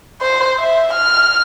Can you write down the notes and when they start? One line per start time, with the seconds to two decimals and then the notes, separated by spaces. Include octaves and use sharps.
0.21 C5
0.59 E5
0.93 F6